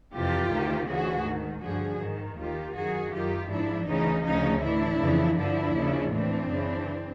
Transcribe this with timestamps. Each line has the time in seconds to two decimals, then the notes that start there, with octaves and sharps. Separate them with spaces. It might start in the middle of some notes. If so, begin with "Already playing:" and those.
0.13 F2 C3 E3 F4 G4
0.50 D2 C3 D#3
0.88 D2 C#3 E3 F#4 G#4
1.25 G#2 D#3
1.63 G2 D3 F3 F#4 G#4
2.00 G#2 D#3
2.37 D#2 D#3 F4 G4
2.75 F#2 D#3 F#4 G#4
3.12 F#2 D#3 F4 G4
3.50 G#2 F3 D4 E4
3.87 D2 C#3 E3 C#4 D#4
4.25 D2 C#3 F3 C#4 D#4
4.62 A2 E3 D4 E4
5.00 F2 C#3 E3
5.37 G2 D3 F3 D4 E4
5.75 D#2 C#3 F3
6.12 A2 E3 C4 D4
6.49 F#2 C#3 E3